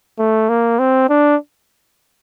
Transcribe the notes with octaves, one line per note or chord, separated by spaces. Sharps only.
A3
A#3
C4
D4